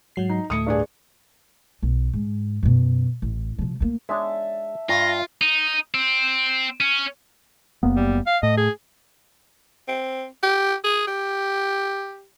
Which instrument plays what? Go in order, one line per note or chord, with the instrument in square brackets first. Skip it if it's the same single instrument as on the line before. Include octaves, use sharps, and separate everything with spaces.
[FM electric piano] G#2 F#3 C7
[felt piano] D#4
[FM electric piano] D2 A2 A3 [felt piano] D#6 C#7
[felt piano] G2 D4 G#4
[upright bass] B1
G#2
F#2 B2
A1
C3 F3
A3 A#3
[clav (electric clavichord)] G#3 D4 C#5 [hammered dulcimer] E5 A5
[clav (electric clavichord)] G2 A5 [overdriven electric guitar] F4 [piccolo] A#6
[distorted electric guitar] D#4
C4
C#4
[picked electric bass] F#1 A#3 B3
[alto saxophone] G3
F5
[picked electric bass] A2 [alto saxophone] D#5
[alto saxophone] G#4
[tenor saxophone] C4
G4
G#4
G4